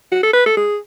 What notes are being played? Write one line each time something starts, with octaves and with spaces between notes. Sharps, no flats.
F#4
A4
B4
A4
G#4